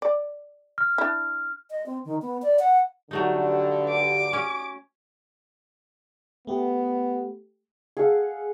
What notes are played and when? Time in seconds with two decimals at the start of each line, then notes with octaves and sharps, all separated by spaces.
0.02 D5
0.78 F6
0.98 D4 E4
1.70 D#5
1.86 C4
2.05 D#3
2.22 B3
2.42 D5
2.59 F#5
3.11 G2 D3 F#3 A3 D#4
3.89 D6
4.33 C#4
6.47 A3 B3 G4
7.97 G#4 A4 F5 F#5